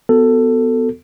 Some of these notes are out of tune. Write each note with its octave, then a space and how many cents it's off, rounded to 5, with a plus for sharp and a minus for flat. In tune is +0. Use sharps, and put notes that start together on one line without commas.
B3 +15 F#4 +0 A4 +15